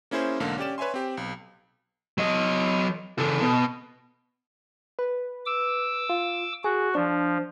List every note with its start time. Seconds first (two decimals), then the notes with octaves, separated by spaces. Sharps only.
0.11 A#3 C#4 E4 G#4 C5
0.40 B1 G#2 D3 A#3 A4 F5
0.58 C#4 G4 D5 E7
0.78 B4 C#5 E5 G#5 C6
0.94 C4 G4
1.17 B1
2.18 F#3 D#5
3.18 C#3 A4
3.41 B2
4.99 B4
5.46 D6 E6
6.09 F4
6.64 F#4 G#4
6.95 F3 D4